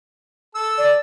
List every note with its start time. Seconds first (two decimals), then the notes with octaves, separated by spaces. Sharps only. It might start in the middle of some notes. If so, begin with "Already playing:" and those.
0.55 A4 E6
0.78 D5